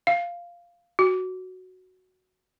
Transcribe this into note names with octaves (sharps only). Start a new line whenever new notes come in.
F5
F#4